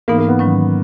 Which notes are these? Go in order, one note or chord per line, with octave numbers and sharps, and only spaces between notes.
G#2 E3 A#3 B3 D#4
A#3
B3
G#2 D#3 F#3 C#4